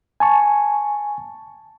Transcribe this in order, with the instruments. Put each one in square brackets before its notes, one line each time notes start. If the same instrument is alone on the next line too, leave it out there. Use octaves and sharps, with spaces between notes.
[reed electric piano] G#5 A5 C#6